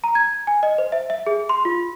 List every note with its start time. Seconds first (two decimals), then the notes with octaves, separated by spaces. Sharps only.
0.04 A#5
0.15 G#6
0.47 G#5
0.63 D#5
0.78 C5
0.92 E5
1.10 E5
1.27 G#4
1.49 C6
1.65 F4